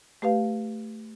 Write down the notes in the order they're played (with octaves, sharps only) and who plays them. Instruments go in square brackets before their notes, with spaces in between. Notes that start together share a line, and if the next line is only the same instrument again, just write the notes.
[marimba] A3 G4 B4 F5